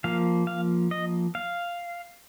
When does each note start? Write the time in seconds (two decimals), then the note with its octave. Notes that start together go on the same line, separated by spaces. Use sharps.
0.04 F3 A#3 F5
0.47 F5
0.91 D#5
1.35 F5